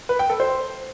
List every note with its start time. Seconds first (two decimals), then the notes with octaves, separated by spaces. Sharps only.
0.09 B4
0.19 G5
0.30 A4
0.40 C5